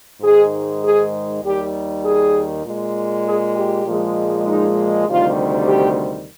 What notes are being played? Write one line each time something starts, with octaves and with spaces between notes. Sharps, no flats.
G#2 D#3 G#3 G#4
G#4
D#2 D#3 G3 G4
G#4
A#2 G#3
G#4
G4
A#2 F3 G#3
D#4
D2 C3 D#3 G3 F4
G4